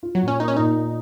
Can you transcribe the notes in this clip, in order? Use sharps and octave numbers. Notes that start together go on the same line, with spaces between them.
F4
F#3
A#2
C#4
A#3 D#4
C#4
A#2 D#4
A#3